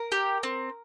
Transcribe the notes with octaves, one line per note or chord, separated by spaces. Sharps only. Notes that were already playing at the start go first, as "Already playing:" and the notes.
Already playing: A#4
G4
C4